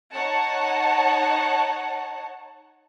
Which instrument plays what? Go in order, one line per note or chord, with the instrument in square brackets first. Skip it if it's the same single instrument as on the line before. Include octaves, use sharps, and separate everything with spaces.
[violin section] D#4 C#5 F#5 A5